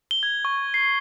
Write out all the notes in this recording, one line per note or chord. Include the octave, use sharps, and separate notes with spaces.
G7
G#6
C#6
C7